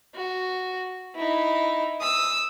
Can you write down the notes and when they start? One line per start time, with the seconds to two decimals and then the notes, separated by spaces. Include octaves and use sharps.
0.15 F#4
1.15 D#4 E4
2.00 D#6 E6